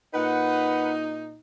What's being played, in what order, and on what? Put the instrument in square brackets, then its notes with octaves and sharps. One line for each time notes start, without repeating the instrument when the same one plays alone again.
[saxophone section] A#2 D#4 [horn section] B4 F#5